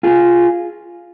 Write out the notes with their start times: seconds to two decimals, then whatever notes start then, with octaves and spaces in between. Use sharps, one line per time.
0.03 F4 G#4